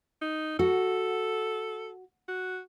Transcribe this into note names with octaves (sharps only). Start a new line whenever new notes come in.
D#4
F#4 A4
F#4